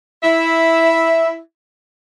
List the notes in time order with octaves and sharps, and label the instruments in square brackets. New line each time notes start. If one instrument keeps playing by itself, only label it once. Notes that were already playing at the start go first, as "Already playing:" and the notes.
[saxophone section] E4 E5